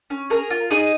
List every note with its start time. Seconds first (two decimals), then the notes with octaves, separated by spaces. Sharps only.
0.10 C#4
0.30 G#4 A#4 A#5
0.50 F4
0.70 D#4 G#4 D#5